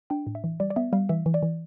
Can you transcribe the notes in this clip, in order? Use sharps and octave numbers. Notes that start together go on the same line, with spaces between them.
D4 G5
A2
E5
E3
G3 D5
D5
B3 E5
G3 F5
E3 E5
E3
D5
E3